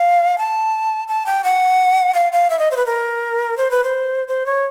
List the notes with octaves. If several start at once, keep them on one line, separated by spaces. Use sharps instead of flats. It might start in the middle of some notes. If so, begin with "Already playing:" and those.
Already playing: F5
A5
A5
G5
F#5
F5
F5
E5
D#5
C5
B4
A#4
C5
B4
C5
C5
C#5